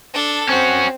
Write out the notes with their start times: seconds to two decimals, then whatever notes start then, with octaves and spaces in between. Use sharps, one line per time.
0.14 D4 A4
0.49 C4 C#4 F#4